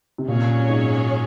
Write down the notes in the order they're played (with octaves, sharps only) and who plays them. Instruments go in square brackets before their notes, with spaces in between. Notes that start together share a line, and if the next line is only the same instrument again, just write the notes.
[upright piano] C3
[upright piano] A#2 [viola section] F#3 C#4 G#4 C#5
[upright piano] G#2